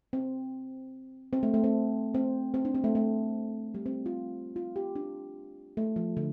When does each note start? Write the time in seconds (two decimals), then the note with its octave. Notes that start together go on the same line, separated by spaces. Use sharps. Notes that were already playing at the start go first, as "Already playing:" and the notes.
0.13 C4
1.33 C4
1.43 A3
1.54 A3
1.64 C4
2.15 C4
2.54 C4
2.65 D4
2.75 C4
2.84 A3
2.95 A3
3.74 G3
3.86 C4
4.06 F4
4.56 F4
4.76 G4
4.96 D4
5.77 A3
5.96 F3
6.17 D3